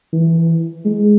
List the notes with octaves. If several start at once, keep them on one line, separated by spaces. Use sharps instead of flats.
E3
G#3